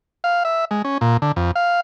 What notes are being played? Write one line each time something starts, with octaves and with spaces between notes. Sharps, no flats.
F5
E5
G#3
C#4
A#2
D3
F2
F5